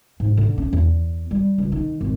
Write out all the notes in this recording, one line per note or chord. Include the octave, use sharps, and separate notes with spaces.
G#2
D3
C#4
E2
G3
C#2
D#3
G#1